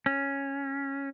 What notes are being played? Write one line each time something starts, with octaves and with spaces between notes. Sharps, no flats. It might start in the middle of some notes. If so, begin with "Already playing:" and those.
C#4